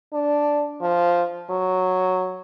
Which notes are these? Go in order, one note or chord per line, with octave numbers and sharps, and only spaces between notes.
D4
F3
F#3